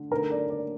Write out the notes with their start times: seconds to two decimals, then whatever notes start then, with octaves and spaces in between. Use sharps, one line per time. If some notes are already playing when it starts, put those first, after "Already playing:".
Already playing: D3 A3
0.11 D3 A3 D#4 A#4
0.31 D5
0.50 D5